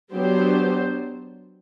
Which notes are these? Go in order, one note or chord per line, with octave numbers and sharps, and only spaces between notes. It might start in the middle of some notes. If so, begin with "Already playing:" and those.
F#3 B3 D4 G4 C5